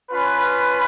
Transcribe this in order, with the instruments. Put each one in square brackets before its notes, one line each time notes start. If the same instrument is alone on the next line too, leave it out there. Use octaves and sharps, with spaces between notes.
[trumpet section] C#4 F4 B4